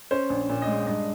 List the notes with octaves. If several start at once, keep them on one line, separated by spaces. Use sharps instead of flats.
C#4 C5
A#1
A#2
D#5
G#3
G2 D#5